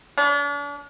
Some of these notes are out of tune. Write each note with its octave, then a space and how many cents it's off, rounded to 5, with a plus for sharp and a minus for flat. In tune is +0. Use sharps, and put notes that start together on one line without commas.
D4 -40